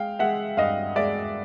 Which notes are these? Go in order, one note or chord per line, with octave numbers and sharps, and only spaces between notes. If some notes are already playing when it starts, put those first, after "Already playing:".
Already playing: G#3 F5 G5
G#3 E5 F#5
G2 D#5 F5
G#3 D5 E5